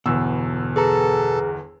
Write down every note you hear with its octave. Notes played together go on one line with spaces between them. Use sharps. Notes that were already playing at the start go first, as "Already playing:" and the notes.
G1 E2 B2 E6
G#4 A4 B4 A#5